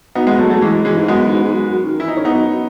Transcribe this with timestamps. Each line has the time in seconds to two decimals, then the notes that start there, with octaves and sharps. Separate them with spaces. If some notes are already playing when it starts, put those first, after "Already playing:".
0.15 B2 B3 D#4
0.27 G#3 B3
0.38 C#3 F#3 A3
0.50 F#3 A3
0.61 B2 E3 G#3
0.85 C#3 E3 G#3
0.97 G#2
1.08 F#2 G#3 B3
1.31 G#2
1.43 G#2
1.54 F#2
1.69 F#2
1.85 D#3
2.00 E3 E4
2.08 D#4
2.12 D#3 C#4
2.23 G#2 B3 D#4
2.35 F#2